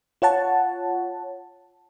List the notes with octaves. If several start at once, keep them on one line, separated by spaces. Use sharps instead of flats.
F4 C#5 F#5 A5